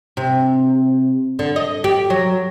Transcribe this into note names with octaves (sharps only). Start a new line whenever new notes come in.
C3
D3
D#5
G4
F#3